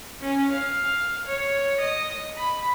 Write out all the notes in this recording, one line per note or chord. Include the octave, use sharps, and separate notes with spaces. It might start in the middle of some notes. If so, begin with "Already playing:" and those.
C#4
F5
C#5
D#5
B5